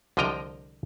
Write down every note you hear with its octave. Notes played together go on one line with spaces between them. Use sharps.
C2 D3 F3 D#5 G5 A#5